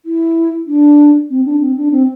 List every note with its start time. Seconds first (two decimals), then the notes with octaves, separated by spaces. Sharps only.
0.05 E4
0.67 D4
1.30 C4
1.45 D4
1.61 C4
1.77 D4
1.92 C4